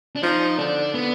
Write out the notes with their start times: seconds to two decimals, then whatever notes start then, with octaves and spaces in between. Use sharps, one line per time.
0.16 D4
0.23 F3 D#4
0.58 D3 D4
0.94 B3